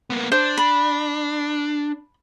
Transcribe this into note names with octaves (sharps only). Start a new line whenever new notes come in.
A#3 B3
D4 C5
B5